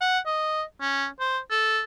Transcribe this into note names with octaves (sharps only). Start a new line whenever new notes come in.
F#5
D#5
C#4
C5
A4